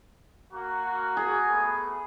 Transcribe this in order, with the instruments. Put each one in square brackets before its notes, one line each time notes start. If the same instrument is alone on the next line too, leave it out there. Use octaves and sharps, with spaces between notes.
[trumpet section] A#3 F#4
[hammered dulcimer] G#4
[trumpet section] A3 B3